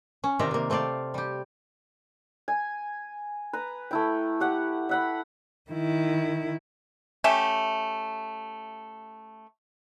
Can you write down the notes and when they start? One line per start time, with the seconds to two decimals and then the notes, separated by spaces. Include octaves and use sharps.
0.24 C#4
0.39 C3 D#3 F4 D5 E5 A#5
0.51 C3 A#3
0.70 A3 C4 F4 D5 F5
1.14 G3 G4
2.48 G#5
3.53 B4 A#5
3.91 A3 E4 G5
4.40 G4 F#5
4.89 E5 F#5 B5
5.71 D#3 E4
7.24 A3 C#4 G4 E5